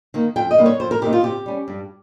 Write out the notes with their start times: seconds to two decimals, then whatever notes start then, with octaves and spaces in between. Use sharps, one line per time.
0.14 D#3 A#3
0.36 F2 G5
0.51 D#5
0.58 C3 D#3 G3 A#3
0.66 C#5
0.80 F2 C5
0.91 A#4
1.02 C3 D#3 A#3 D#4 G4
1.13 F4
1.23 C3 G4
1.46 G3 C#4
1.68 G2